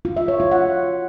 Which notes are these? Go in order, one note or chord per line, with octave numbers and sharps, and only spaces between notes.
F4
E5
C#5
F4
F#5